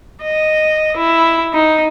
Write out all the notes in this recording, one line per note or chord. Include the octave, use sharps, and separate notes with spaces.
D#5
E4
D#4